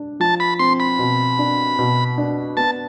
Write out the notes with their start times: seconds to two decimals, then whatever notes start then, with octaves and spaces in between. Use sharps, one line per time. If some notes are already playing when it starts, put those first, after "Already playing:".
Already playing: D4
0.20 F3 A5
0.40 B5
0.59 C4 C6
0.80 B5
0.99 B2
1.39 D4
1.79 B2
2.18 D4
2.57 B3 A5